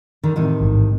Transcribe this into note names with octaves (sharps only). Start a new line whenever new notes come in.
D3 D#3
A2 C3 D#3
A1 G#2